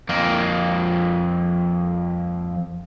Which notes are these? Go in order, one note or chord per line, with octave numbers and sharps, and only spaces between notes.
F2 A#3